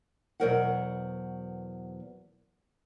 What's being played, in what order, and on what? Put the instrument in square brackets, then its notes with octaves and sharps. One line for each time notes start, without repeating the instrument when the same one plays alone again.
[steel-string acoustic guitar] E2 B2 F#3 A#4 C5 F#5